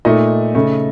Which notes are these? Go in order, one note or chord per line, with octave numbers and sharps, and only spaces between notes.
A#2 A3 D#4 D#5
C#3 A3